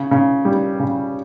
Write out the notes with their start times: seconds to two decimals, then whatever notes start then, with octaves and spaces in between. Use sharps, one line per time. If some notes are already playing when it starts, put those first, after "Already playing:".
Already playing: C#3
0.11 C#3
0.45 G3
0.79 C#3